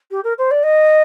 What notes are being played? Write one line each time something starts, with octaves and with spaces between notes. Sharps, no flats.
G4
A#4
C5
D5
D#5